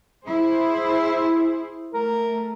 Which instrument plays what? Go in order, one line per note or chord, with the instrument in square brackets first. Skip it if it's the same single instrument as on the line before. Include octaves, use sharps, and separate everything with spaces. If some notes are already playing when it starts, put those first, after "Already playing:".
[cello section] E4 G#4 C5
[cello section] A3 [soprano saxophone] A#4